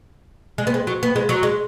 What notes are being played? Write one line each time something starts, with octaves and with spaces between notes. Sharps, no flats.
G#3
B3
G#3
F#3
B3
G#3
F#3
G#3